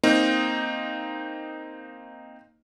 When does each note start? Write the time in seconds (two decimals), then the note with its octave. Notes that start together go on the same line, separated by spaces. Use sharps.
0.03 A#3 C4 D#4